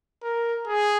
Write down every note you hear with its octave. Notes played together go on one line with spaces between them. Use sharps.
A#4
G#4